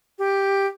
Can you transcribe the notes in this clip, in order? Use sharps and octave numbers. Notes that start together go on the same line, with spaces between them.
G4